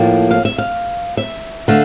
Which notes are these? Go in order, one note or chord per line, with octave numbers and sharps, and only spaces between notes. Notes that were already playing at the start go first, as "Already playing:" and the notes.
Already playing: A2 F3 A#3
F5
E5
F5
E5
D3 A3 F5